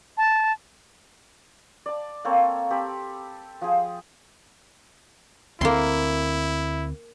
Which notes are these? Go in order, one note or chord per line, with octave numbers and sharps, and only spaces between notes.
A5
D5 A5
A#3 C4 A4 C#5
C4 G4 A4 B5
F3 G#4
D2 A#3 C4 E4 C6